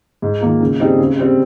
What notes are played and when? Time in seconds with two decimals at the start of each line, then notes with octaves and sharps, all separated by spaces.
0.22 G#2
0.41 D#3 A#3 F4
0.60 C#3
0.79 G3 C4 D#4 G#4
0.98 C#3
1.18 G3 C4